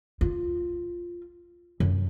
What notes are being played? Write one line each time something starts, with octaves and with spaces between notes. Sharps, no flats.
F4
F#2